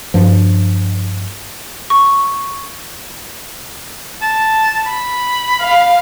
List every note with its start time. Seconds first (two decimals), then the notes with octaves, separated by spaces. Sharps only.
0.14 G2 F3
1.90 C#6
4.22 A5
4.86 B5
5.62 F5